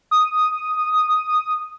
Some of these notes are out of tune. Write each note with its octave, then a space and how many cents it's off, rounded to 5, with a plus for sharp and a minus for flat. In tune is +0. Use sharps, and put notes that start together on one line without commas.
D#6 +0